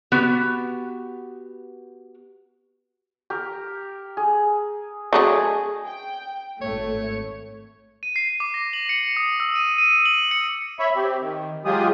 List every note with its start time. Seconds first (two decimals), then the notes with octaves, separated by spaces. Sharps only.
0.12 B3 F#4 G4
3.30 G4 A#4
4.17 G#4
5.13 F#3 A3 D4 G#4 D#5
5.86 G5
6.61 G#1 A3 C#5
8.03 D#7
8.16 C7
8.40 D6
8.54 A#6
8.73 F#7
8.89 C#7
9.17 D#6
9.40 E6
9.56 D#7
9.78 D#7
10.06 F#7
10.31 C#7
10.79 C#5 E5 B5
10.96 C4 G4
11.21 D#3
11.65 F#3 G#3 F4 G4 G#4 D#6